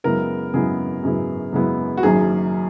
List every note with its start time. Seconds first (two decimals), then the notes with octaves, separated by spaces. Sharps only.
0.04 F#2 C#3 G#3 B3 E4 A#4
0.54 F#2 C#3 G#3 B3 E4 G#4
1.03 F#2 C#3 G#3 B3 E4
1.52 F#2 C#3 G#3 B3 E4
1.97 F#4
2.03 F#1 F#2 D#3 G#4